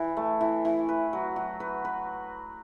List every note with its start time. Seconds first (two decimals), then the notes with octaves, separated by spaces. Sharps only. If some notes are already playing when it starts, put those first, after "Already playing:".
Already playing: E3 E4
0.17 A3
0.41 E3
0.65 E3
0.89 B4
1.13 F#3
1.36 F#3
1.60 B4
1.85 B4